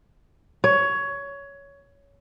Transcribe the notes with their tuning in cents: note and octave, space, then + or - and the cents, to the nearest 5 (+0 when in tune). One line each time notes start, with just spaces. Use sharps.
C#5 +15